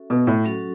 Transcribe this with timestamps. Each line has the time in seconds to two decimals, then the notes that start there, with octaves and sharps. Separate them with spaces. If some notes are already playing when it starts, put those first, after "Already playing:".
Already playing: C#4 F#4 A4 E5
0.10 B2
0.27 A2
0.44 F#3 C#4 F#4 A4